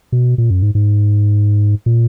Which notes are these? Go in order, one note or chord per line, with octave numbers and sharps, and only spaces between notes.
B2
A#2
F#2
G#2
G#2
A#2